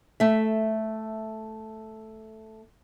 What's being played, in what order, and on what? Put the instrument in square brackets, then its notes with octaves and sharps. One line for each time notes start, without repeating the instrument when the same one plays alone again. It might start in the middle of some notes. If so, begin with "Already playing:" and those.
[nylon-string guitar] A3 E5